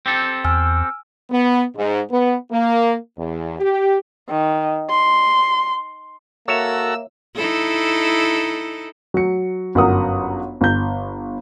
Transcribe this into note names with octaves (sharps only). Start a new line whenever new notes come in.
C4 G4 A4
E2 G#5 E6 F6
B3
G#2
B3
A#3
E2
G4
D#3
C6
A#3 F#4 A4 A#4 C#5 E5 E6
D#4 E4 A4
F#3 C#7
G1 F#2 A#4 F#5 A#5 D#6
G1 G6